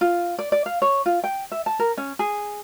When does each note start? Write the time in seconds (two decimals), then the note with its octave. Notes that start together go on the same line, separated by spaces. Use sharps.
0.01 F4
0.39 D5
0.52 D5
0.66 F5
0.82 C#5
1.06 F4
1.24 G5
1.52 E5
1.66 A5
1.79 A#4
1.97 C#4
2.19 G#4